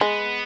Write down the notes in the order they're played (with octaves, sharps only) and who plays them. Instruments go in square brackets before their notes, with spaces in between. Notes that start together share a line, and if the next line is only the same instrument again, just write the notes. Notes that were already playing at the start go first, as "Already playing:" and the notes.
[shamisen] G#3 [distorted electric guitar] B3